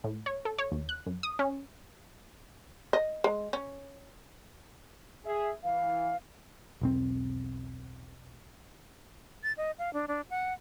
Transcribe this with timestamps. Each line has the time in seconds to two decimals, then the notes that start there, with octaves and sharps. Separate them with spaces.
0.04 A2
0.26 C#5
0.45 A4
0.58 C#5
0.72 D#2
0.89 F#6
1.06 F#2
1.23 D#6
1.39 C#4
2.93 D#5
3.24 G#3
3.53 C#4
5.25 G#4 E5
5.64 E3 F5
6.81 E1 B1 C4
9.43 A6
9.57 D#5
9.79 F5
9.94 D4
10.08 D4
10.30 F#5